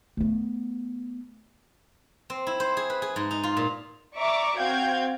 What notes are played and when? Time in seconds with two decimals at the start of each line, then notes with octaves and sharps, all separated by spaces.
0.17 A3 B3
2.30 C4
2.47 E4
2.60 C5
2.77 G#4
2.90 B4
3.02 G#4
3.16 G#2
3.31 D#4
3.43 F4
3.57 A#2
4.16 D5 E5 A#5 C#6 D6
4.59 C4 F#4 F5 G5 G6 G#6